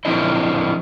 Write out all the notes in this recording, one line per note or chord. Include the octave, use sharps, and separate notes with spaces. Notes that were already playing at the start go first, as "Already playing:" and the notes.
F3 C4 D4 E4 D#5